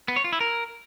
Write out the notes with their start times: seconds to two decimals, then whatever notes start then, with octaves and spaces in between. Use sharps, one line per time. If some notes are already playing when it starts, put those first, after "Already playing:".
0.08 B3
0.16 C#5
0.24 F4
0.32 E4
0.41 A#4